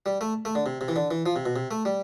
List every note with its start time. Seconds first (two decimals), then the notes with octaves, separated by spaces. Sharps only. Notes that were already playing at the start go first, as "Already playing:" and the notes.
0.06 G3
0.21 A3
0.45 A3
0.55 D3
0.66 C3
0.81 C3
0.88 E3
0.96 D3
1.11 E3
1.26 F3
1.36 C3
1.46 B2
1.56 C3
1.71 A3
1.85 G3